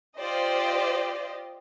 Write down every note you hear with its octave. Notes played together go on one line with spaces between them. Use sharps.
F4 G4 C5 D5 D#5